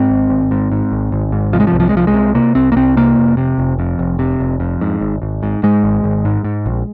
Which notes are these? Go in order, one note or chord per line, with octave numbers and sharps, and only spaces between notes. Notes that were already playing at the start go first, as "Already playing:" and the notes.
Already playing: G#2 C4
G#1
G#1
G#2
G#2
G#1
G#1
G#2
C3 F3
G#3
F3
C2
F3
G#3
C2 F3
G#3
C3
C3 A#3
C2 C4
A#3
C2 C4
C3 A#3
F1
C3
F1
F2
F1
C3
F1
F2
G#2
G#1
G#1
G#2
G#2 G#3
G#1
G#1
G#2
G#2
A#1